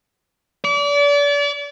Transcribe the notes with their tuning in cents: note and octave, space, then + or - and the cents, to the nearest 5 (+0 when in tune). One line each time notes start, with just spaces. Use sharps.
D5 -35